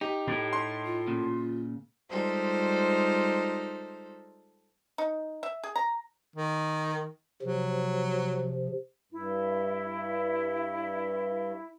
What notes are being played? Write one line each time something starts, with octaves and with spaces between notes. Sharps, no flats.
D#4 G4
A2
C6
F4
A#2 C#3
G3 G#3 D#4 F4 A4 C5
D#4
E5
G#4
A#5
D#3
C3 F3 F#3
G2 E4